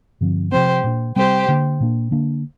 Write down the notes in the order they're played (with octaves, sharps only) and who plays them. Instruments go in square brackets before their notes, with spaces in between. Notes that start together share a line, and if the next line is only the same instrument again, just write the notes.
[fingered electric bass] G2 D3 F3 C4
[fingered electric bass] C3 F3 C4 [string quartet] G4 C5
[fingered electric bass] A#2 A#3 D4
[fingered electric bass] C3 G3 C4 [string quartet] G4 C5
[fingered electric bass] D3 A#3 D4
A#2 A#3 D4
D3 A#3 D4